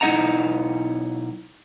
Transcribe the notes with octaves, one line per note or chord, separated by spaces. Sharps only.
B1 D#4 E4 D#5 F#5 A#5